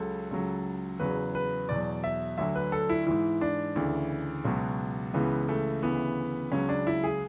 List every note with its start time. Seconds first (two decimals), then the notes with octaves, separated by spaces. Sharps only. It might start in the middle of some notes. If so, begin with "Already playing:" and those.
Already playing: C#2 C#3 F#3 A4
0.31 C#2 C#3 F#3
1.00 E2 C#3 F#3 B4
1.35 B4
1.69 E2 B2 F#3 D5
2.04 E5
2.38 D2 D3 F#3 E5
2.55 B4
2.72 A4
2.89 E4
3.07 G#2 E3 E4
3.41 D4
3.76 D2 C#3 E3
4.45 C#2 B2 F#3
5.14 C#2 C#3 E3 B3
5.49 A3
5.83 D2 C#3 E3 B3
6.52 C#2 C#3 F#3 C#4
6.69 D4
6.87 E4
7.04 G#4